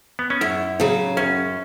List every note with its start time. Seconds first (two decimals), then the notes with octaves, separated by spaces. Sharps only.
0.19 B3
0.30 C#4
0.41 F#2 E4
0.80 C#3 F#3
1.17 F#2 C#4